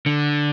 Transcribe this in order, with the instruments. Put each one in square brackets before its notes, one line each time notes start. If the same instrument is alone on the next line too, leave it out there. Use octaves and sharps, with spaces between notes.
[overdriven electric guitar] D3